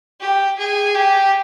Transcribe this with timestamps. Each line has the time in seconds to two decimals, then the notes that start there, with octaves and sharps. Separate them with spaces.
0.21 G4
0.59 G#4
0.95 G4